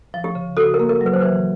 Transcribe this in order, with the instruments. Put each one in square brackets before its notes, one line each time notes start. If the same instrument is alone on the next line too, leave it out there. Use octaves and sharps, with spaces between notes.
[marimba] F3
[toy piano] G4
[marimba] C#3
[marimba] F#4 [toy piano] A4
[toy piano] A#4
[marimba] A#3
[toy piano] A#4
[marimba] F#3
[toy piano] B4
C5
[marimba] E3 [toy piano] B4